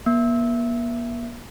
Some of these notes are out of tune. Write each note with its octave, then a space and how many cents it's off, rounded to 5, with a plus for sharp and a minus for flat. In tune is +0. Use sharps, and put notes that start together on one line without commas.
A#3 +45